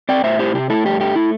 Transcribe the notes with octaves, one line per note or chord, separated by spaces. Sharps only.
C4 D5 G5
A2 C5 E5
E4 G4 C5
C3 G4
A3 E4 A4
G2 G4
A3 G4
E4